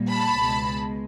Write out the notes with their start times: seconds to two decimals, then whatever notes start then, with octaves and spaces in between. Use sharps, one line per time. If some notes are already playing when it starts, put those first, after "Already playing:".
Already playing: A#2 G3 A#3
0.09 A5 B5
0.38 C#2 B2 G#3